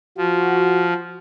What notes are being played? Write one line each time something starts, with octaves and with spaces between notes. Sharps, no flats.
F3 F#4